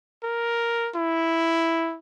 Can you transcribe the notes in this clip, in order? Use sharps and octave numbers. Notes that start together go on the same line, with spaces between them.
A#4
E4